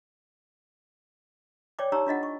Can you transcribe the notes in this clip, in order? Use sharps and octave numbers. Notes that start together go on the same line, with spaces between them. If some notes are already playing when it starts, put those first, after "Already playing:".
C#5 D5 G5 D6
D#4 G4 C#5 A#5 E6
D4 F4 D#5 F#5
C#6